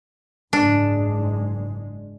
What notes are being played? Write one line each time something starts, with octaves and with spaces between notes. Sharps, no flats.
F#1 G#2 G#3 D4